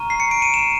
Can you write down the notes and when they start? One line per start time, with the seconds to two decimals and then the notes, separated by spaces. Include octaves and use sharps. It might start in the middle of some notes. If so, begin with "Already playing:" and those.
Already playing: A#5 C#6 F6 D#7
0.10 C7
0.20 C#7
0.31 D7
0.42 D#7
0.54 E7